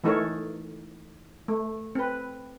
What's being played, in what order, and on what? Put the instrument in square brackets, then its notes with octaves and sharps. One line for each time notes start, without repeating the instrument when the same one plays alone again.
[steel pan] E3 A3 D#4 A4 A#4 C#5
A3
C4 B4